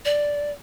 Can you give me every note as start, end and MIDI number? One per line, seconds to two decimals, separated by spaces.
0.05 0.51 74